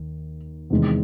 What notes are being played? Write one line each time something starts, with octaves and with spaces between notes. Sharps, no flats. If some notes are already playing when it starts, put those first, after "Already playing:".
Already playing: D#2
E2 C3 D#3 G#3